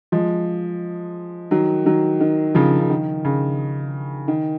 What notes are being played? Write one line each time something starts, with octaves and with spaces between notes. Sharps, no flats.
F3 G#3
D#3 F#3
D#3 F#3
D#3
C#3 F3
C#3
D#3
C#3
D#3